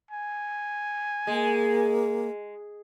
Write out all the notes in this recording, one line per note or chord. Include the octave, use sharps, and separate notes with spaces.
G#5
G#3 A#3